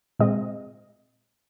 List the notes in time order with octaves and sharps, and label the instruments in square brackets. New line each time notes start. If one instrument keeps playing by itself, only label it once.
[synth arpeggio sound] A#2 G#3 C4 D#5